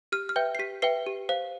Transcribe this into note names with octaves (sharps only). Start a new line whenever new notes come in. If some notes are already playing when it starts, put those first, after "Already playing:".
G4 F6
F6
B4 E5 G5 G6
C7
G4 B6
B4 E5 G5 C7
G4
C5 F5